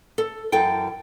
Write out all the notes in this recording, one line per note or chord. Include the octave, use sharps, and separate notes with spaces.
A4
F#2 E3 A4 G5